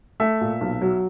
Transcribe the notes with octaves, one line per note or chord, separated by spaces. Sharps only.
A3 E5
A#2
B1
F#3